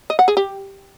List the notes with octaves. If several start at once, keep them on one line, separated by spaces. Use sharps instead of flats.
D#5
F#5
G#4
G4